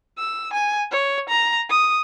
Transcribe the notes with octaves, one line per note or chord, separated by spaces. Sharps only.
E6
G#5
C#5
A#5
D#6